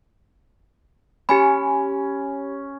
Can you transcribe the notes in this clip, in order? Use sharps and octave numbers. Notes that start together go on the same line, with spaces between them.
C#4 G4 G#5 B5